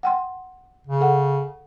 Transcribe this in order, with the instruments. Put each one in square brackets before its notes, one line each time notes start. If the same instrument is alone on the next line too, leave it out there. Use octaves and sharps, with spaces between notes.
[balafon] F#5 G5 C6
[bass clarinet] C#3
[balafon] A4 F#5